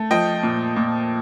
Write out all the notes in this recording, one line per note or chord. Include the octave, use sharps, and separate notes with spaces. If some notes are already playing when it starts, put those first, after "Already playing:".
Already playing: A3
F3 D#5 G5
A#2
A#2